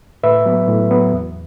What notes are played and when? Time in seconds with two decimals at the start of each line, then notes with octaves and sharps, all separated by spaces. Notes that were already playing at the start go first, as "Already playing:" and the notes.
0.23 A2 B4 E5
0.46 F#3 B3
0.68 A2
0.91 F#3 B3
1.13 E2